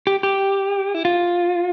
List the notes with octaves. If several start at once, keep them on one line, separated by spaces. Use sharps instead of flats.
G4
G4
E4
F4